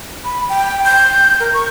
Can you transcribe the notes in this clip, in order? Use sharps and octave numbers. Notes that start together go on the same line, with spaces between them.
B5
G5
G6
A#4
C#6